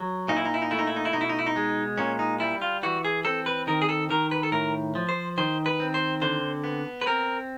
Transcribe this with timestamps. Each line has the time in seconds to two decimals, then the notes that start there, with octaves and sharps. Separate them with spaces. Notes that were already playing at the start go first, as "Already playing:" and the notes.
Already playing: F#3
0.28 A#2 D#4
0.37 E4
0.45 D#4
0.54 E4
0.62 D#4
0.71 A3 E4
0.79 D#4
0.87 E4
0.96 D#4
1.05 E4
1.13 B2 D#4
1.21 E4
1.29 D#4
1.39 E4
1.46 D#4
1.56 G#3
1.98 A#2 C#4
2.19 D#4
2.40 G3 E4
2.62 F4
2.83 E3 F#4
3.05 G#4
3.25 C4 A4
3.46 B4
3.67 D#3 A#4
3.82 G#4
3.89 A4
4.09 D#3 A#4
4.31 B4
4.43 A4
4.52 A2 A#4
4.95 F3
5.09 C5
5.38 D#3 C5
5.66 B4
5.80 C4
5.94 C5
6.22 D3 C5
6.64 B3
7.01 B4
7.06 C4 A#4